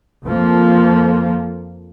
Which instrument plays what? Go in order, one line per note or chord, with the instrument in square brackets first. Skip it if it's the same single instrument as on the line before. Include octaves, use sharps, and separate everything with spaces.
[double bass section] F2 F3 A#3